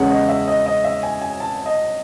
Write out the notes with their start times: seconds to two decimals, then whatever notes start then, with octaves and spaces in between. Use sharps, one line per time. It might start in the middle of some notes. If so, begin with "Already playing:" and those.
Already playing: E2 C#3 G#3 C#4 F#5
0.10 D#5
0.29 E5
0.48 D#5
0.66 D#5
0.84 E5
1.03 G#5
1.22 G#5
1.40 A5
1.66 D#5